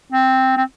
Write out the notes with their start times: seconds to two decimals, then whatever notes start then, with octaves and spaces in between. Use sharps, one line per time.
0.12 C4
0.57 C4